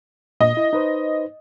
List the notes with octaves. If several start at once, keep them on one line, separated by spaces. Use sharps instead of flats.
A#2 D#5
E4
D#4 B4 C5